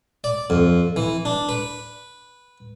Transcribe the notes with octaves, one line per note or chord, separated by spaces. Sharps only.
D5
F2
E3
D4
B4